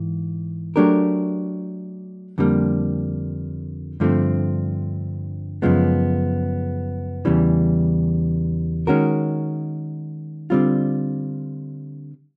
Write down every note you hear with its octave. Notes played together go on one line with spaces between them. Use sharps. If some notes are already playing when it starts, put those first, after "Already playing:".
Already playing: G#2 E3
F#3 A3 D4 G4 A#4
F2 D3 G3 A#3
G2 D3 F3 A3 C4
F#2 C#3 F3 G#3 B3
E2 C#3 E3 G3
D#3 G#3 C#4 F#4 A#4
D3 G3 C4 F4